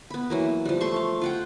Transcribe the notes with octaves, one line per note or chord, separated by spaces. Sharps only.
B3 B5
E3 F#3 A#3
F3 G3
A3 C6 C#6
F5
F4 F#5 G5